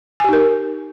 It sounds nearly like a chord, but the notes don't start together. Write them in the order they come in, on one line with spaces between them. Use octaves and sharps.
G#5 G4 D#4 A#4